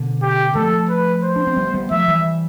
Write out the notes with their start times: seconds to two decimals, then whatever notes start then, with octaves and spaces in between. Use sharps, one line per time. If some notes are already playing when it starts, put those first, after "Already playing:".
Already playing: B2 D3
0.22 G4
0.55 F3 A3 A4
0.90 B4
1.24 C5
1.36 D4
1.47 C4
1.57 G3 B3
1.74 G3 B3
1.91 F3 A3 E5
2.08 E3 G3